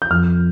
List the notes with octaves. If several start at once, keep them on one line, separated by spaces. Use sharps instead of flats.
G6
F2 F6